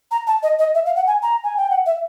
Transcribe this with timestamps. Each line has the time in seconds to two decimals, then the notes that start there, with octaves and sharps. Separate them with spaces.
0.11 A#5
0.27 A5
0.43 D#5
0.59 D#5
0.75 E5
0.85 F5
0.96 F#5
1.07 G#5
1.22 A#5
1.43 G#5
1.57 G5
1.70 F#5
1.86 E5